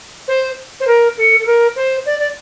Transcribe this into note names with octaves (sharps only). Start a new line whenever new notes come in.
C5
C5
A#4
A4
A4
A#4
C5
D5
D5